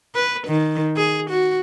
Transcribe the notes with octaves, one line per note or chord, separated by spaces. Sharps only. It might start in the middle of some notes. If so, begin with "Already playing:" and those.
B4
D#3
G#4
F#4